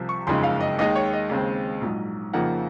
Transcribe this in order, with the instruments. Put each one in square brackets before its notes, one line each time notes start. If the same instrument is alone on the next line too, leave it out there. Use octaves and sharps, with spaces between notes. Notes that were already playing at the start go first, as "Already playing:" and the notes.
Already playing: [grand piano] C2 C3 F3
C#6
F#1 F2 C#3 G#3 D#4 C6
F5
D#5
D#2 D#3 G#3 D#4 D#5
C#5
D#5
D#2 C#3 G#3 C4
A#1 G#2 F#3
F2 C#3 F3 A#3 D#4 F#5